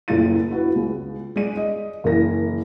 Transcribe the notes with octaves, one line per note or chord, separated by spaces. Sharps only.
F#1 A2 F4 A6 D#7
E4 F#4 B4
C#2
G#3 D5 D#7
D#5
F#1 E3 A#4 A#6